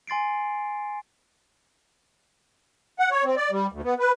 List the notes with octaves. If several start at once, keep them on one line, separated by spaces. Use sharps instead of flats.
G#5 C6 A6 C7 D7
F#5
C#5
C4
D5
G3
D2
B3
B4